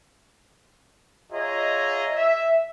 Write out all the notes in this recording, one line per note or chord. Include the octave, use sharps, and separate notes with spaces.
F4 G#4 C#5 D#5 E5 A#5
E5